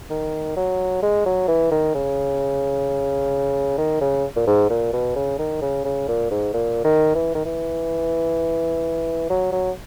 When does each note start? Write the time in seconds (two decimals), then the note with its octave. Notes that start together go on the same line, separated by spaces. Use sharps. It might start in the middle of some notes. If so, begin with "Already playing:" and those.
0.10 D#3
0.56 F#3
1.03 G#3
1.26 F#3
1.48 E3
1.71 D#3
1.95 C#3
3.78 D#3
4.01 C#3
4.36 A#2
4.47 G#2
4.70 A#2
4.93 B2
5.16 C#3
5.39 D#3
5.62 C#3
5.85 C#3
6.08 A#2
6.31 G#2
6.54 A#2
6.84 D#3
7.15 E3
7.35 D#3
7.46 E3
9.30 F#3
9.52 F#3